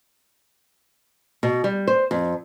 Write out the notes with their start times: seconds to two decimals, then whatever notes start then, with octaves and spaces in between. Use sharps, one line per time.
1.43 B2
1.64 G3
1.87 C5
2.11 F2